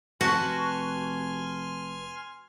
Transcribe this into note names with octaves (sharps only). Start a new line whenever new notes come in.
F1 F#4 B4 G#5 A5 C6 F6